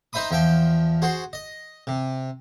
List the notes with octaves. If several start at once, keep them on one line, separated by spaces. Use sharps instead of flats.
D#4 C5 E5 B5 D#6
E2 F3 E5 G5
F#4 G#4 C5
D#5
C3